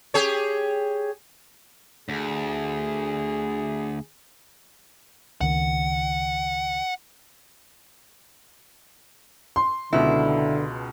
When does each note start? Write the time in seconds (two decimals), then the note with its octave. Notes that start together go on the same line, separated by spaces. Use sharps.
0.14 G4 G#4 C#5
2.09 D2 G#4
5.41 C#2 D#3 F#5
9.56 C6
9.93 C#2 B2 D3 E4